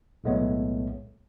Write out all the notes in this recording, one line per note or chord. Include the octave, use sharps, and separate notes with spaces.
B1 A2 G#3 A3 B3 C#5